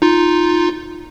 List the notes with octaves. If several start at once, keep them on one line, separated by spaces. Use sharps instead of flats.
D#4 F4